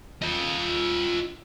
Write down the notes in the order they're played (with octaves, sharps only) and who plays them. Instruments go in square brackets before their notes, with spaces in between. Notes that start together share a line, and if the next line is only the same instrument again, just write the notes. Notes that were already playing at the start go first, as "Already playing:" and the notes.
[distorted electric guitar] F4 D#5